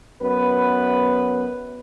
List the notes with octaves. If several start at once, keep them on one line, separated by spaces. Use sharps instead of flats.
F#2 B3 B4